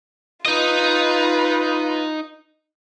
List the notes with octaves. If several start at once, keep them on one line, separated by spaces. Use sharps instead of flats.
D#4 F4 B4 D#5